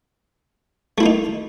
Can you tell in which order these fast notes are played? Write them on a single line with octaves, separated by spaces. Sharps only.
A3 E4 A#3 D#4